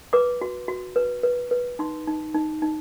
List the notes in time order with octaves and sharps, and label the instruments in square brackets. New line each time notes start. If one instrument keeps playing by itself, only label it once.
[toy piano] B4 D6
F#4
F#4
B4
B4
B4
D#4 C6
D#4
D#4
D#4